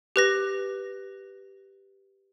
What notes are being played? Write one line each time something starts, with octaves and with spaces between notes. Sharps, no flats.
G4 B4 A#6